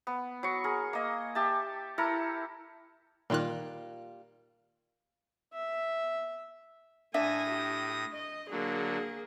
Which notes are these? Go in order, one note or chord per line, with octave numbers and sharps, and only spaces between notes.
B3
F#3 C#6
G#4 A#4
A#3 D#5
G4 E5 A5
E4 A4 A#4
A#2 D#3 G3 A#3 F4 F#6
E5
A2 D4 E5 G#5 D#6 A#6
G4
D#5
D3 F#3 A#3 G#4